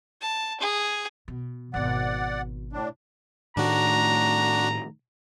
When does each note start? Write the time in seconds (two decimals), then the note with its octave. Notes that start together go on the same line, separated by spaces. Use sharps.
0.21 A5
0.60 G#4
1.28 B2
1.74 G#1 B2 D5 F#5
2.73 A2 D4
3.57 A2 D#3 A3 D4 F#4 A#5